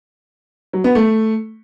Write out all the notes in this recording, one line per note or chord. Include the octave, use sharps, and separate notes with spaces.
F#3
B3
A3